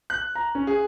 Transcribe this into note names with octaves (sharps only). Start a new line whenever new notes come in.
F#6
A#5
C#4
G#4